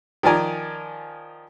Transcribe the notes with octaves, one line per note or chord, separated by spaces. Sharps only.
D#3 F3 D5 G#5 A#5